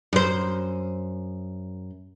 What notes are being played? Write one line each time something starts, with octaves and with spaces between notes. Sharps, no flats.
F#2 C5